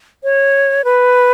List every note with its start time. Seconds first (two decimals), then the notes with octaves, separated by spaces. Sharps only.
0.24 C#5
0.84 B4